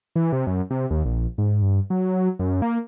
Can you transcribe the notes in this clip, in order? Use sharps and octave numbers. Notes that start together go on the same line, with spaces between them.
E3
C3
F#2
C3
D#2
A#1
G#2
G2
F#3
F#2
A#3